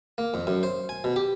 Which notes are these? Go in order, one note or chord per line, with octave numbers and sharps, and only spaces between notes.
A#3
F2
F#2
C5
G#5
B2
G4